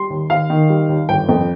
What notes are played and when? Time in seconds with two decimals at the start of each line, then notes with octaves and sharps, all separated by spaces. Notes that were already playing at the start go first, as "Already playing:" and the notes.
Already playing: G3 C6
0.10 D#2
0.30 D#2 F5
0.50 D#3
0.70 G3
0.89 D#2
1.09 G1 G5
1.29 F2